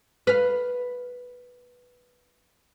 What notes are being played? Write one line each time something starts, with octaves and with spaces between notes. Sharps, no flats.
B4 F5